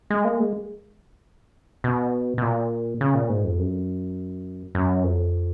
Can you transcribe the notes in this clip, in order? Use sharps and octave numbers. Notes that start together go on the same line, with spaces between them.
G#3
A#3
G#3
B2
B2
A#2
C#3
A#2
G#2
F2
F#2
F#2
F2